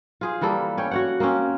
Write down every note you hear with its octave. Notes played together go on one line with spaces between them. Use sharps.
F4 G#4 C5
E3 G3 A#3 A4
C#4 C#5 G5
F#4 C#5 F#5
A#3 C4 C#4